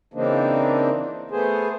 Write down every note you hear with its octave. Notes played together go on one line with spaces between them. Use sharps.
C#3 E3 A#3 C4 D4 D#4
A3 B3 G#4 C5